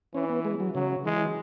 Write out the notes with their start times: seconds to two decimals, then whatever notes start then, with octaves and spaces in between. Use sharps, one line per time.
0.14 E3 C#4
0.29 B3
0.45 G#3
0.60 F#3
0.75 C#3 F#3
1.05 E3 G#3